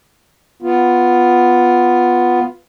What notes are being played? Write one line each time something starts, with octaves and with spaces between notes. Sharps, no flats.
B3 F4